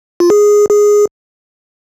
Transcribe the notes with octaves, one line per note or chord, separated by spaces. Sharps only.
F4
G#4
G#4